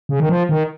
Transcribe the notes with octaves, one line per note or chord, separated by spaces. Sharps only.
C#3
D#3
F3
D#3